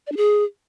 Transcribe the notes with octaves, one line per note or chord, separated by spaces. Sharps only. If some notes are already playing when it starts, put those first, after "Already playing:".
D5
D4
G#4